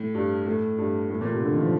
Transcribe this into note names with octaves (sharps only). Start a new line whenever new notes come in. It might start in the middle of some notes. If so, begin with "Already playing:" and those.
Already playing: A2
G2
A2
G2
A2
A#2
C3
D3
D#3
F3